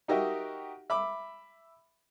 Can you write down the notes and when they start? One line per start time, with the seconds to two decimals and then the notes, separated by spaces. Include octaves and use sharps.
0.08 D#4 F#4 G4 A#4 D#5 E5
0.90 E5 B5 D6